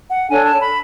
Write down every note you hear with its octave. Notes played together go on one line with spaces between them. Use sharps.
F#5
D4 A4 C#5 G#5
A5
B5